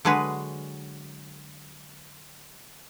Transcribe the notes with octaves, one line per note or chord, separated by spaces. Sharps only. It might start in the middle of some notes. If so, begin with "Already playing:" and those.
D3 F#3 G#3 G#4 B4